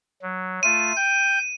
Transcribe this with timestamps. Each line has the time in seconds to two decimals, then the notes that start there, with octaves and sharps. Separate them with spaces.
0.22 F#3
0.63 A3 F4 D#7
0.96 G5 G6